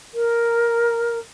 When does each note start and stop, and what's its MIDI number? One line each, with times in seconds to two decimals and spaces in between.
0.14 1.19 70